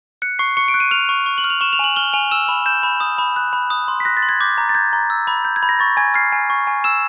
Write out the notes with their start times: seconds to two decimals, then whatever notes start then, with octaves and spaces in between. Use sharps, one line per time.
0.22 F#6 C#7
0.39 C#6 C7
0.57 C#6 C#7
0.68 D7
0.74 F#6
0.80 D#7
0.91 F6 F7
1.09 C#6
1.26 C#6
1.38 F#7
1.44 F6
1.50 F7
1.61 C#6 E7
1.73 F7
1.79 G#5 F#7
1.96 F6 G7
2.13 G#5 F7
2.31 E6 E7
2.49 B5
2.66 G6 E7
2.83 B5
3.00 D#6
3.18 B5
3.36 F#6
3.53 B5
3.70 D#6
3.88 C6
4.00 B6
4.05 F#6 A#6
4.17 A6
4.22 C6
4.29 G#6
4.41 D6 G6
4.58 A#5
4.69 A6
4.75 G6 G#6
4.93 A#5
5.10 E6
5.27 B5
5.45 G6
5.56 G#6
5.63 B5
5.69 A#6
5.79 C#6 A6
5.97 G#5 G#6
6.14 F6 C7
6.32 G#5
6.50 C#6
6.67 G#5
6.84 E6 E7